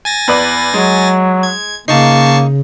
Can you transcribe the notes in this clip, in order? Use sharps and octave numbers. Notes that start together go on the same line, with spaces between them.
G#5 A6 A#6
E2 B4 D5
F#3 G#3
G#6
C#3 A#3 D#4 A5 C#6 C7